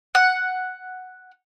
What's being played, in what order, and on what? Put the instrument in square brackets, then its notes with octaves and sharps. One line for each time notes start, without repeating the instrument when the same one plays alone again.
[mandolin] F#5